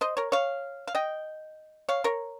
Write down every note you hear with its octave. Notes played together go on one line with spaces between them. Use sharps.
C5 D#5
A#4 C#5
C#5 F5
F5
D#5 G5
C#5 F5
A#4 C#5